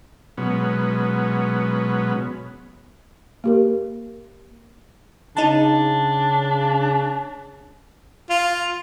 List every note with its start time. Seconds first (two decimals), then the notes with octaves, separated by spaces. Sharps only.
0.38 B2 F#3 G#3 B3 C#4
3.44 A#3 G4 A#4
5.37 C#3 D4 D#4 A5
8.30 F4